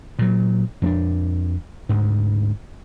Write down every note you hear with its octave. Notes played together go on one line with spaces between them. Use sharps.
A#2 F#3
F2 C4 D4
D2 G#2